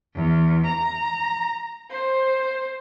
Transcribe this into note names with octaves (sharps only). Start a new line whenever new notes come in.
E2
A#5
C5